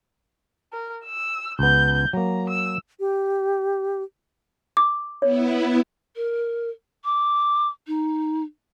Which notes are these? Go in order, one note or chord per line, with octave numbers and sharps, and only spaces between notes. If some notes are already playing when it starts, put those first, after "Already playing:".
A#4
E6
C#2 B3 G6
F#3 A#3 A#5
E6
G4
D6
B3 E4 C#5
A#4
D6
D#4